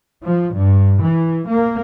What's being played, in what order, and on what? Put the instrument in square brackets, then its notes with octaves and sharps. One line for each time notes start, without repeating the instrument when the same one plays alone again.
[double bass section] F3
G2
E3
A#3